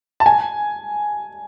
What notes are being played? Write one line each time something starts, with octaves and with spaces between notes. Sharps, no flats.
A5
G#5